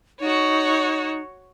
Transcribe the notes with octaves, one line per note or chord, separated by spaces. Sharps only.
D#4 F#4 C#5